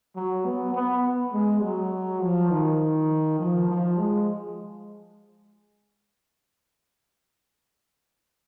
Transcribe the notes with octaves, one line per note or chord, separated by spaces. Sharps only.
F#3
B3
B3
G#3
F#3
F3
D#3
F3
F3
G#3